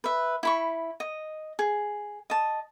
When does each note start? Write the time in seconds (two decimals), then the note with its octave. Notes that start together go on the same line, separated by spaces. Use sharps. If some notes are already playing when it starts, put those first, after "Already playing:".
0.04 B4 E5
0.43 E4 B5 C#6
1.00 D#5
1.59 G#4
2.30 D#5 A5